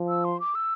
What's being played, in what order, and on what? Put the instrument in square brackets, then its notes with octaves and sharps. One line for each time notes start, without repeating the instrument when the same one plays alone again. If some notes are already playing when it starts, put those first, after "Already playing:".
Already playing: [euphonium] F3
[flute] E6
C6
D6
E6